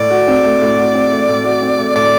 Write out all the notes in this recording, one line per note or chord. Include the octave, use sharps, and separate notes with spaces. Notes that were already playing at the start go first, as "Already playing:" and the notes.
Already playing: A2 D5
F#4
C4
A3
A2
F#4
C4
A3
A2
F#4
C4
A3
A2 D5